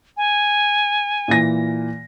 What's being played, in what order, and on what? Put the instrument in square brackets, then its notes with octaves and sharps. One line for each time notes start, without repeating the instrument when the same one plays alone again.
[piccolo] G#5
[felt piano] A#2 E3 A#6